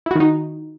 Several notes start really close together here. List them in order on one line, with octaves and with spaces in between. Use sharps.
E4 F#4 D#3 D#4